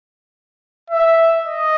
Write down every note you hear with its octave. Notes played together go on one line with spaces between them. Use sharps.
E5
D#5